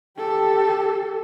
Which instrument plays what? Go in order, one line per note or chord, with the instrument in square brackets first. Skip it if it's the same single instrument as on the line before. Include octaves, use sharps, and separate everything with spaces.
[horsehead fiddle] G4 A4